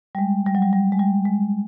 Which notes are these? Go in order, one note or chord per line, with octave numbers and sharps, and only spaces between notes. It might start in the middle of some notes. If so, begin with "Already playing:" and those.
G3
G#3
G3
F#3
G3
G3
G#3
G3
G#3